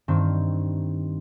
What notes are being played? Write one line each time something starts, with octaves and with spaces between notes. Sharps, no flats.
G2 D#3 C4